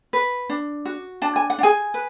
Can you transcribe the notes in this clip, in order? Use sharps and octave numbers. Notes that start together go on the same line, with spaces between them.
B4
D4
F#4
D4 A5
G#5
F#5
D4
G#4 G#5
B4